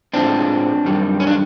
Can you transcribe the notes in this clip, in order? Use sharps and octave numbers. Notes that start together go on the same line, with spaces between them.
A2 F3 G#3 C4 D4
F#2 D#3 G3
C#4
D4